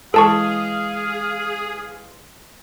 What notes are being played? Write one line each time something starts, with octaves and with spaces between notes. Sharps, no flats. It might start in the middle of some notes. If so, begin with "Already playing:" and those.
E3 G#3 G#4 A4 F5 A5 C#6